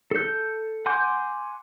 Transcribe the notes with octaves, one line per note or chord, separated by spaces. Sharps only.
A4 G6
F#5 G#5 C6 D6 G6